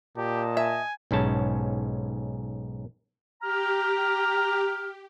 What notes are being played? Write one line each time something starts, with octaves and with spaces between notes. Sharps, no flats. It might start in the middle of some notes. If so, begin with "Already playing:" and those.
A#2 G4 D#5 A5
E5 G#5
B1 G#2 C#4 A5
G4 A#5 F6